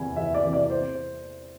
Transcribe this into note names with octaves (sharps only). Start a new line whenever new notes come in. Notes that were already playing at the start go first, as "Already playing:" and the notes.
Already playing: E2 C3 E3 G#5 B5
E2 E5
D5
C3 E3
D5
C5